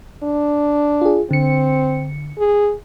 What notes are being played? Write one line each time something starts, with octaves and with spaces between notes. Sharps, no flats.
D4
F4 G#4
D3 C4 C#7
G#4